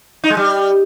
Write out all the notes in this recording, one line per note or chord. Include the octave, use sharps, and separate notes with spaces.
D#4
G#3
G3